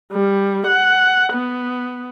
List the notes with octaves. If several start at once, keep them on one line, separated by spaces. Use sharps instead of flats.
G3
F#5
B3